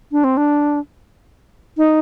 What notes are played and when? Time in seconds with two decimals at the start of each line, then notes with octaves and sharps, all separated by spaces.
0.12 D4
0.24 C4
0.37 D4
1.78 D#4